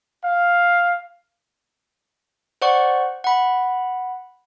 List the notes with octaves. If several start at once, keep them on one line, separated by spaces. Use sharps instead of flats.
F5
C5 D5 F#5 C#6
F#5 B5